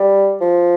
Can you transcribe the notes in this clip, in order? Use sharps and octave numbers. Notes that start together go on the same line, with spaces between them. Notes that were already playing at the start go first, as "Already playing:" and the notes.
Already playing: G3
F3